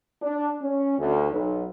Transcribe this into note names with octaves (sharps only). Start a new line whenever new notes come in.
D4
C#4
D2
B1